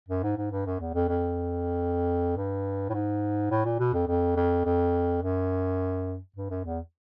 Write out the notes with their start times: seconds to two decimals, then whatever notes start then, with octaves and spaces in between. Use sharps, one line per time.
0.09 F#2
0.23 G#2
0.37 G#2
0.51 G2
0.66 F#2
0.80 E2
0.94 F2
1.09 F2
2.37 G2
2.89 A2
2.94 G#2
3.51 A2
3.65 A#2
3.80 B2
3.94 F2
4.08 F2
4.36 F2
4.65 F2
5.22 F#2
6.36 G2
6.50 F#2
6.65 E2